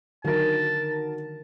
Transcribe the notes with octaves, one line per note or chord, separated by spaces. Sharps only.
D3 D#3 F#3 A#4 A5